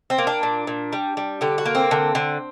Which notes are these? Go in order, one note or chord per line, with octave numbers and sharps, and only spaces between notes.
C4
A#3
D4
A#2
A#2
G3
G3
D3 G4
F#4
A#3
C4
D3
D3